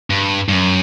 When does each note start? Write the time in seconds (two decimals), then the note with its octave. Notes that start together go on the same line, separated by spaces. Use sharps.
0.10 G2
0.49 G2
0.52 F#2